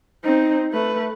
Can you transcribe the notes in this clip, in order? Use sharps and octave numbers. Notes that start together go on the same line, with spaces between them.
C4 D#4
A3 B4